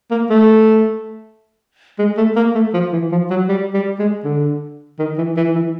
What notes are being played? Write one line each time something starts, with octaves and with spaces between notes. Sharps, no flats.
A#3
A3
G#3
A3
A#3
A3
F3
E3
F3
F#3
G3
G3
G#3
D3
D#3
E3
E3
E3